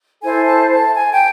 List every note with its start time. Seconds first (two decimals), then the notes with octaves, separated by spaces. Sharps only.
0.21 E4 A4 C5 G#5
0.45 A5
0.69 A5
0.94 G#5
1.12 G5